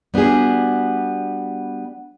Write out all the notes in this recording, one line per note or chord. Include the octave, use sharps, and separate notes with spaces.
G3 B3 D4 F#4 G#4